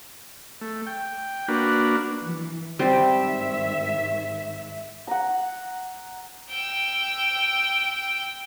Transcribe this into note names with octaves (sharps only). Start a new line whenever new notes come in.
A3
G5
A#3 D4 F#4 B4
E3
G#2 D#3 G3 C4 C5 E5
F#5 A#5
G5 E6